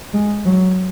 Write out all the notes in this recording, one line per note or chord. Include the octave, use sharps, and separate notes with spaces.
G#3
F#3